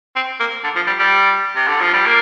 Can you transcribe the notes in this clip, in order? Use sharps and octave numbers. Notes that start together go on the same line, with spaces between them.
C4
A#3
D3
F3
G3
G3
C3
D3
F3
G3
A#3